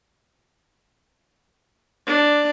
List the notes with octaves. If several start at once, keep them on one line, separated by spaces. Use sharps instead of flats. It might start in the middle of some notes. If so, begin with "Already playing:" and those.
D4